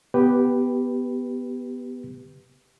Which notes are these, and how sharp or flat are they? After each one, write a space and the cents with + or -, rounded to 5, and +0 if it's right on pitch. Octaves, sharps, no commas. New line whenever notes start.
B3 +0 G4 +0 B4 +0